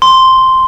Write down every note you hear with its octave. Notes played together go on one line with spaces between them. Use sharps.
C6